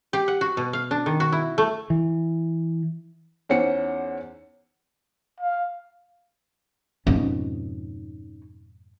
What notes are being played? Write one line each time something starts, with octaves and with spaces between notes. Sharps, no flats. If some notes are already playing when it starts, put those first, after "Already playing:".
G4
F#5
F#4
B2
F5
D4
D#3
F#4
E4
A3
E3
E2 C#4 D#4 C5 F#5 C#7
F5
F2 G#2 B2 C#4 D#4